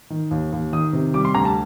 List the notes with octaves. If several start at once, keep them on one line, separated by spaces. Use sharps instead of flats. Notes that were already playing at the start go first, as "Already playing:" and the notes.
D#3
D#2
D#2
D#3 D#6
C3
G3 D6
C6
D2 A#5
A5